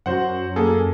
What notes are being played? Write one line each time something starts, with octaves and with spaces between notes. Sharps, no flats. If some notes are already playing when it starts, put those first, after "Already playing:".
F#2 F#4 C5 F#5
A#3 G#4 A4